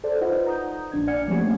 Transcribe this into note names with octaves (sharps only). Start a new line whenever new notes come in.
A4 C5 D5
D#4 F4 B4 C5 D#5 F#5
A#5 D#6 G6
A#1 D4 G#6
D5 F#5 G#5 F6 G#6 C#7
F3 G3 A3 A#3 C#4 G4